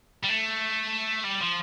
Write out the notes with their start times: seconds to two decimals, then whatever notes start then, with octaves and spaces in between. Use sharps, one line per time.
0.24 G3
0.30 A3
1.25 G3
1.41 F3